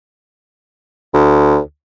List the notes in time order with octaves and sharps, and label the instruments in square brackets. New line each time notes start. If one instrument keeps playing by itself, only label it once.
[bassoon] D2